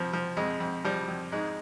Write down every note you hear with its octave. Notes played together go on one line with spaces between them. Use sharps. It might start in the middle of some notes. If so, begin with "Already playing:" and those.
Already playing: F2 F3
F3
F2 G#3
F2
F3 G3
F2
G#2 G#3